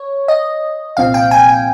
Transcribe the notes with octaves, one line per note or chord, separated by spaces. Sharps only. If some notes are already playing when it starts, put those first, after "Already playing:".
Already playing: C#5
D#5
C2 A#2 F3 C4 F5
G5
G#5
G5